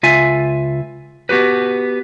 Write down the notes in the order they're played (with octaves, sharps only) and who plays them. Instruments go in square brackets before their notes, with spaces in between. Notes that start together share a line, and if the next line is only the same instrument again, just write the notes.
[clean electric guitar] C#2 F4 E5 G#5
B3 F#4 G4 B4